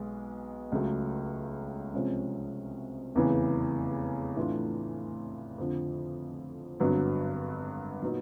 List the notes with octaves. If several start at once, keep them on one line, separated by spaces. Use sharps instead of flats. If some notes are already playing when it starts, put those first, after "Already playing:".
Already playing: B1 B2 G#3
C#2 C#3 F#3 A3
C2 C3 F3 G#3 C#4
F1 E2 C#3 E3
A2 E3 A3 D4 F4
F2 D3 F3
G#1 G2 D3 F#3 B3
A#2 F#3 B3 D#4